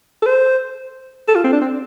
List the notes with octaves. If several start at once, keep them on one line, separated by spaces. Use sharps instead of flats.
A4
C5
A4
F4
C4
D4
C4